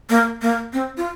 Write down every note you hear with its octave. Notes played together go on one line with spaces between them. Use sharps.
A#3
A#3
C4
F4